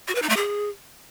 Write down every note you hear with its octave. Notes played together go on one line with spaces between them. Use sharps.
F#4
B4
D#4
A3
G#4